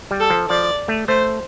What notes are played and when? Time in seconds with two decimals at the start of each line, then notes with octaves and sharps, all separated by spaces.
0.11 G3
0.20 A4
0.30 F3
0.50 F3 D5
0.88 A3
1.08 A3 C5